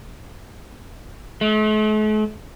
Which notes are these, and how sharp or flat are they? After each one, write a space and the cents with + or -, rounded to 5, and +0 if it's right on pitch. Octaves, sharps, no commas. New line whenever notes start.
A3 -45